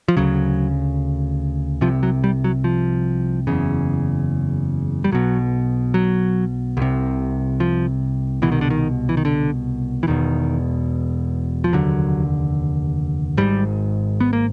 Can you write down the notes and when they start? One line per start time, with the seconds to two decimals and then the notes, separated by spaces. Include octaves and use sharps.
0.08 F3
0.17 D2 C#3 F#3
1.81 C2 C3 F3
2.03 F#3
2.24 G3
2.44 F#3
2.64 F3
3.47 F#1 E2 C#3
5.04 G3
5.12 B1 B2 F#3
5.94 F#3
6.77 C2 C3
7.60 F3
8.42 C2 B2 E3
8.52 D#3
8.61 D3
8.70 D#3
9.09 E3
9.17 D#3
9.25 D3
10.03 E3
10.07 E1 E2 B2 D#3
11.64 F3
11.73 F1 D#2 D3 F#3
13.37 G#1 G#2 G3
14.20 B3
14.33 A#3